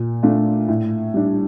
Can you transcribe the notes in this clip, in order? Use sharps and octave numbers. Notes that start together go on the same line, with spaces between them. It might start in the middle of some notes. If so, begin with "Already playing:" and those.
Already playing: A#2
A3 D4 F4
A2
G3 D4